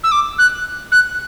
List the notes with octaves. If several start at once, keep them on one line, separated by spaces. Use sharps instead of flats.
E6
D6
F#6
F#6